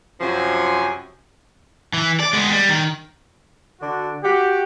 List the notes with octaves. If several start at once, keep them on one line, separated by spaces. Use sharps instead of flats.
F#2 C3 F3 F#3 G#5
E3
D5
G#3 B3
G3
D#3
D3 D4 F#4
F#4 G4